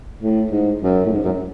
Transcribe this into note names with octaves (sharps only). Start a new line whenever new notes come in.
A2
G#2
F#2
A2
G#2
F#2